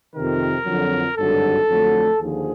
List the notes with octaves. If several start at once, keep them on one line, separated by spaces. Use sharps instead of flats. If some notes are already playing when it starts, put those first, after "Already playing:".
F2 C3 D#3 A#4
F2 D3 F#3
G#1 G2 D3 F#3 A4
F2 D3 F#3 A3
D#2 D3 F3 G#4